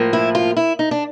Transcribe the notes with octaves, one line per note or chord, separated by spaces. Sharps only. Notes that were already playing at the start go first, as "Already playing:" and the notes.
Already playing: A2 F3 A#3
E4
F4
E4
D#4
D4